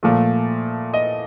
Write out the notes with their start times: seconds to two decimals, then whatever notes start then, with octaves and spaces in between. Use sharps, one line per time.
0.03 A#2 F3 A3
0.94 D#5